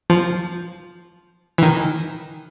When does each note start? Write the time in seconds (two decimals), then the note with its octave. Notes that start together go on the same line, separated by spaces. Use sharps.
0.10 F3
1.58 D#3 E3